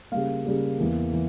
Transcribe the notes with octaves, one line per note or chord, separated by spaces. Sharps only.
C#3 G3 A#3 F5
C#3 G3 A#3
E2 E3 A#3
E3